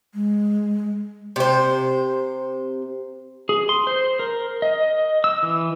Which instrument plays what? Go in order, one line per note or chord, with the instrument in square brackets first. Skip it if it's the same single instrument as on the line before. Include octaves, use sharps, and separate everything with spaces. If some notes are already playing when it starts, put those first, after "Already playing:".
[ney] G#3
[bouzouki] C3 C5
[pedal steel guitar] G#4
C6
C5
A#4
D#5
E6
E3